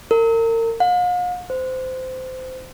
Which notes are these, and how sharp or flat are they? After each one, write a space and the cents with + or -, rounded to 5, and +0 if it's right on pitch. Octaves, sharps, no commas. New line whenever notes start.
A#4 -35
F5 +45
C5 -20